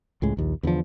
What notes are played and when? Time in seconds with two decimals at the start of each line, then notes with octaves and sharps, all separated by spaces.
0.22 C#2 A2 G#3
0.37 A#1 D#2
0.63 E2 D3 E3 F3